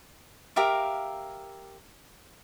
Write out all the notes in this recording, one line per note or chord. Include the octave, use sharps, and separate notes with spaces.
G4 A#4 E5 F5